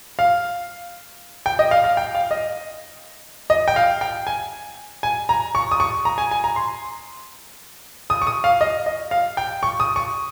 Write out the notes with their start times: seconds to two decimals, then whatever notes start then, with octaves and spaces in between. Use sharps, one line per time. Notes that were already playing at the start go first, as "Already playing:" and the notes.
0.19 F5
1.46 G5
1.59 D#5
1.71 F5
1.84 F5
1.97 G5
2.15 F5
2.31 D#5
3.50 D#5
3.68 G5
3.76 F5
4.01 G5
4.27 G#5
5.03 G#5
5.29 A#5
5.55 C#6
5.71 D#6
5.80 C#6
6.05 A#5
6.18 G#5
6.31 G#5
6.44 A#5
6.56 C6
8.10 D#6
8.22 C#6
8.27 D#6
8.44 F5
8.61 D#5
8.86 D#5
9.11 F5
9.37 G5
9.63 C#6
9.80 D#6
9.96 C#6